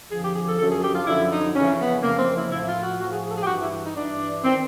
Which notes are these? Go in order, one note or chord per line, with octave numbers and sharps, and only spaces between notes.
F2 D3 F3 G#4
G4
G#4
A4
F#2 D3 F3 A4
G#4
G4
F4
F#2 D3 F3 E4
D#4
F2 C#3 E3 C#4
B3
F2 C#3 E3 A#3
C4
E4
A2 F3 E4
F4
F#4
A2 F3 F#4
G#4
G#4
A4
G#4
G4
G2 E3 F#4
E4
D#4
G2 E3 D4
D#3 C4